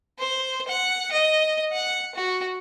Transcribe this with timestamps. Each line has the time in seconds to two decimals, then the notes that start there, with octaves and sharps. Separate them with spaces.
0.19 C5
0.68 F#5
1.12 D#5
1.72 F#5
2.15 F#4